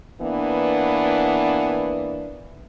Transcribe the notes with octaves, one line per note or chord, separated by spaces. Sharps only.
E3 A#3 B3 D4